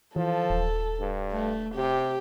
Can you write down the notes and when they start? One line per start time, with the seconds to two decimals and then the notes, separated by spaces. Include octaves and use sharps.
0.16 E3 F3 A4
0.50 D#1
1.00 G2
1.32 A3
1.75 C3 G4